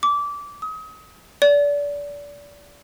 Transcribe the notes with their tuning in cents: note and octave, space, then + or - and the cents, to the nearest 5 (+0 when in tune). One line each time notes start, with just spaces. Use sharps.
D6 -20
D#6 +35
D5 -25